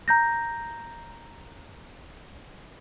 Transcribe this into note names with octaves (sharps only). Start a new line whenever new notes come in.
A#5 G6 A#6